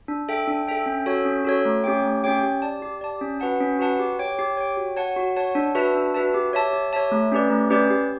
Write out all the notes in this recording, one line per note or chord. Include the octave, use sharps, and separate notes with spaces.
D4
A4 E5 G5
D4
A4 E5 G5
C#4
F#4 A4 C#5
C#4
F#4 A4 C#5
A3
C#4 G4 C#5 G5
A3
C#4 G4 C#5 G5
G4
D5 A5
G4
D5 A5
C#4
F#4 B4 F#5 A5
C#4
F#4 B4 F#5 A5
G4
C#5 G5
G4
C#5 G5
F#4
C#5 F#5 A5
F#4
C#5 F#5 A5
D4
F#4 B4 E5 A5
D4
F#4 B4 E5 A5
G4
C#5 E5 A5
G4
C#5 E5 A5
A3
C#4 G4 B4 D5
A3
C#4 G4 B4 D5
G4